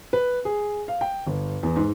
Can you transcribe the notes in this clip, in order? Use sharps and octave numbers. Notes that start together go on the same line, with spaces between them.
B4
G#4
F5
G5
G1
E2
G#2